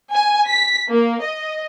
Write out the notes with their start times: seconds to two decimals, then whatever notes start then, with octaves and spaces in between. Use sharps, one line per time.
0.12 G#5
0.48 B6
0.89 A#3
1.22 D#5